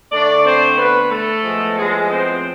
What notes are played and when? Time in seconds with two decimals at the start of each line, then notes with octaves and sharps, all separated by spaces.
0.12 D3 A3 D4 D5
0.45 C4 C5
0.78 B3 B4
1.11 A3 A4
1.44 A2 F3 G#3 B3
1.77 G#3 G#4
2.10 C4 C5